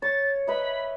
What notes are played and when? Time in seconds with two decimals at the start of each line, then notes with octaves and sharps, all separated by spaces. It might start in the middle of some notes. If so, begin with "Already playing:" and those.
0.02 C#5 A6
0.47 B4 D#5 E5 B5